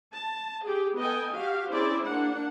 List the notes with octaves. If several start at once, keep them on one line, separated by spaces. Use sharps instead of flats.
A5
G4 G#4
B3 A4 D#5 G5 G#5
F#4 G4 F5
C4 C#4 E4 G#4 C5 D5
A#3 D4 F#5